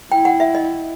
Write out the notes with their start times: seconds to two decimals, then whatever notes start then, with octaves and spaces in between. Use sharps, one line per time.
0.11 E4 G5
0.25 F#5
0.40 E5
0.55 D#5